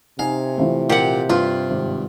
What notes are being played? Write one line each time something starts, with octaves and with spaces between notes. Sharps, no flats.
C3 D#4 F5 G#5
E3 F3 A3
A#2 G4 F#5
G2 F4
G#1